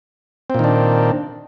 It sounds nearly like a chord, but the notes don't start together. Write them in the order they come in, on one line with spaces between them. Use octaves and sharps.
C4 A#2 D#3 D4